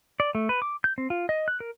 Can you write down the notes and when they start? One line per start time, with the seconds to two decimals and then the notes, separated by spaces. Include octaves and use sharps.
0.20 D5
0.35 A3
0.49 B4
0.62 D6
0.84 G6
0.98 C4
1.10 F4
1.29 D#5
1.48 F#6
1.60 A#4